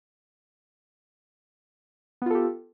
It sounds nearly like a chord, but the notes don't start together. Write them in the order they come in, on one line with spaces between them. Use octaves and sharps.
B3 F4 A4 G4